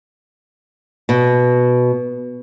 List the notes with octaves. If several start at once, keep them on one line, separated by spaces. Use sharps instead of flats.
B2